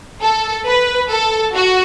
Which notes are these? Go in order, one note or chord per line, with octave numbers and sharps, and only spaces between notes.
A4
B4
A4
F#4